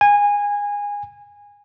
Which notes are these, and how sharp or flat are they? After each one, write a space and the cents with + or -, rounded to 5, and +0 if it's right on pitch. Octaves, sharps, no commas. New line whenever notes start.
G#5 -20